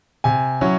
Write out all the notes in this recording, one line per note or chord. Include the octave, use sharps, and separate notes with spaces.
C3 G#5
F#3 C#4 E4